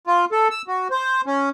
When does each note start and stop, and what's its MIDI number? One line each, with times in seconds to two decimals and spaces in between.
0.07 0.25 65
0.32 0.48 69
0.51 0.62 88
0.68 0.88 66
0.91 1.21 72
1.26 1.49 61